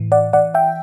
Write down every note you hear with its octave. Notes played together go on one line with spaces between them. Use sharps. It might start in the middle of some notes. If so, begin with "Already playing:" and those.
Already playing: A2 E3
D5 F#5
E3 D5 F#5
E5 G5